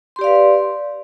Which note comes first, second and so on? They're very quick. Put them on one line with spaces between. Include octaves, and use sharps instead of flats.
C6 G4 D5 F5 B4